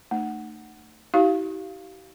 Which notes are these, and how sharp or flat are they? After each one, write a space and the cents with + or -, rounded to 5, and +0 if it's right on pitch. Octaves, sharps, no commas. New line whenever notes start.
A3 +20 D#4 -45
E4 -40 G4 -45 F5 -5